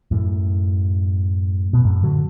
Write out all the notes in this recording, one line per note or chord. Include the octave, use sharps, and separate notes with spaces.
F#2 A2
B2
F#2 A2
D3 F#3